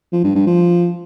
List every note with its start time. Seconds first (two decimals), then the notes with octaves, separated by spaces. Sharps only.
0.12 F3
0.24 G2
0.35 G2
0.47 F3